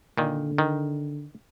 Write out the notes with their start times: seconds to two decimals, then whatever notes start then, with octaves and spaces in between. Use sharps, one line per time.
0.18 A#2 D3 D#3
0.58 D#3